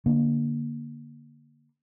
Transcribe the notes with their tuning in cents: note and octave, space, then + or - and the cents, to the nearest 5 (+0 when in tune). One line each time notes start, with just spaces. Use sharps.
D3 -5 A#3 +10